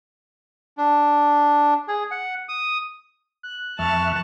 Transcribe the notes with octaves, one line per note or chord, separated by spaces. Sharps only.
D4
G#4
F#5
D#6
F#6
F2 E5 A5 C#6 F6